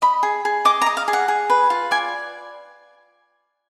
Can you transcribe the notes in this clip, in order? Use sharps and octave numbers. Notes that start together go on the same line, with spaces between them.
D#5 B5
G#4
G#4
D#5 D6
A#5
D#5
F5
G#4
F#5
G#4
B4
F4
D5 G#5